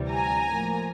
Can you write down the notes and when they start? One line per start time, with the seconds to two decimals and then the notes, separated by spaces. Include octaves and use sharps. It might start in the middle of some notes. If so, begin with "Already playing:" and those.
Already playing: D2 C3 E3 G3
0.10 G#5 A#5
0.48 A2 F3 A#3